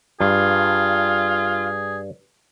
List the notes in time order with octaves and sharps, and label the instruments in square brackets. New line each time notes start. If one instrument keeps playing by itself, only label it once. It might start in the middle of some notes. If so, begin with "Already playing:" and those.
[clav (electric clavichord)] G2 [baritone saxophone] F4 [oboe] G#4